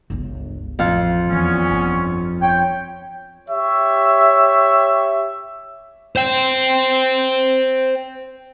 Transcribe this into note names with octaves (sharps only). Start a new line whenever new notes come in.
G1 C#2
A1 F2 A2 F5
E2 A#2 E3 B3 C#4
G1
C#5 G5
G4 C#5 E5
C5 G5